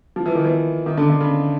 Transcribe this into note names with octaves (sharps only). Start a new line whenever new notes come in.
F3
E3
D#3
E3
D#3
D3
D3
C#3